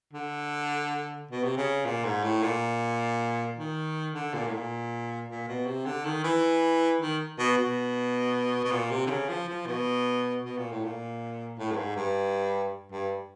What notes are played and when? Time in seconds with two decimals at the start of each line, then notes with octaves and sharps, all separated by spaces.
0.13 D3
1.31 B2
1.44 C3
1.57 C#3
1.85 A#2
2.05 G#2
2.24 A2
2.43 A#2
3.57 D#3
4.14 D3
4.34 A#2
4.47 A2
4.53 A#2
5.29 A#2
5.48 B2
5.66 C3
5.86 D3
6.05 D#3
6.24 E3
7.00 D#3
7.39 B2
7.58 B2
8.64 B2
8.72 A#2
8.91 C3
9.07 D3
9.10 C#3
9.29 F3
9.49 F3
9.67 B2
10.44 B2
10.58 A#2
10.72 A2
10.85 A#2
11.59 A2
11.72 G2
11.77 G#2
11.96 G2
12.92 G2